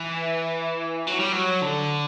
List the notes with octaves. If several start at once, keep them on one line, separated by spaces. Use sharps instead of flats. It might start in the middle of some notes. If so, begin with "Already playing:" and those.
Already playing: E3
F#3
G3
F#3
D3